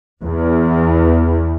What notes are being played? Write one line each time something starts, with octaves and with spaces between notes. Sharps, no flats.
E2